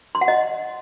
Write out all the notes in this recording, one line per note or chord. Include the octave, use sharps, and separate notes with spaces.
C6
F#5
D#5